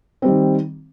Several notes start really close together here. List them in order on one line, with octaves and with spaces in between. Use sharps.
C4 G3 D#3